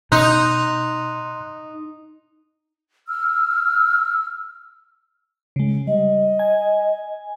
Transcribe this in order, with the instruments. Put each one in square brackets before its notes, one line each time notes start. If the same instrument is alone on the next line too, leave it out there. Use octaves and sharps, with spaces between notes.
[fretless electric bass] B2 [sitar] D#4 [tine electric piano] C6 F#6
[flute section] E6 F6
[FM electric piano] C#3 G#3
[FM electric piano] G3 [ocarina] D#5
[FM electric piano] G#5